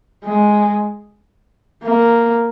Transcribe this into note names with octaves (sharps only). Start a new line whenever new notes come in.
G#3
A#3